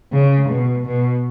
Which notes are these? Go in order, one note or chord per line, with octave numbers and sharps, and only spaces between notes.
C#3
B2
B2